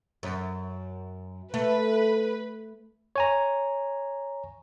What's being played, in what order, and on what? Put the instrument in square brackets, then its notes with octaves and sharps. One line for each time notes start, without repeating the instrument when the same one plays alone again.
[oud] F#2
[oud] A3 [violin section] B4
[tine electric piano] C#5 G#5 A#5